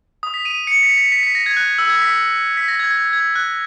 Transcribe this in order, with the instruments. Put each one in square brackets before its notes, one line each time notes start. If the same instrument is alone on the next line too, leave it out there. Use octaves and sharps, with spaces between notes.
[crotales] D#6
B6
D#7
C#7
B6
B6
B6
B6
A#6
G#6
F#6
E6
G#6
B6
B6
A#6
G#6
G#6
G#6
F#6